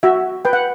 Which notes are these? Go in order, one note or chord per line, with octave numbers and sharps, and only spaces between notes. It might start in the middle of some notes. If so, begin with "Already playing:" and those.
F#4 E5
B4 G5
F#5